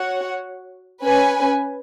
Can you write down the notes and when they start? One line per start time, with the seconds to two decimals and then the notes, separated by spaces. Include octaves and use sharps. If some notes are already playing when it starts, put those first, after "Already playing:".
Already playing: F#4 C#5 F#5
1.03 C#4 B4 G#5